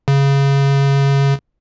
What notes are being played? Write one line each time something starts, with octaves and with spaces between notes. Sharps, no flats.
C#3